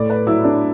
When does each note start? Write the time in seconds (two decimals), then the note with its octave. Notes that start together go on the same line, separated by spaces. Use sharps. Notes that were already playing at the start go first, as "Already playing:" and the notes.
Already playing: A2 D5
0.10 B4
0.27 F#3 E4
0.44 D4